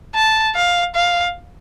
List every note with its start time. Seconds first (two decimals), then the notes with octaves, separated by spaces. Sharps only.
0.15 A5
0.55 F5
0.95 F5